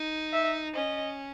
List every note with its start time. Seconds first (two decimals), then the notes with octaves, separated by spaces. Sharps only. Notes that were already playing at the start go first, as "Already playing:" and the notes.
Already playing: D#4
0.33 E5
0.75 C#4 D#5